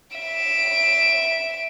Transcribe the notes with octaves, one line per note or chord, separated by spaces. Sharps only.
E5 D7